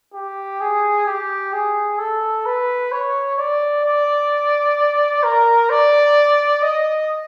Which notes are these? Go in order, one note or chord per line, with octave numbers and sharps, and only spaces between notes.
G4
G#4
G4
G#4
A4
B4
C#5
D5
D5
A#4
D5
D#5